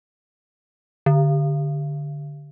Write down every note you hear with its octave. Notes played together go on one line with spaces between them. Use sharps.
D3